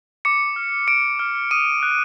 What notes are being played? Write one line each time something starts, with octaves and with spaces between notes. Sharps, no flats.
D6 C#7
F6
D6 D7
F6
D#6 D#7
F#6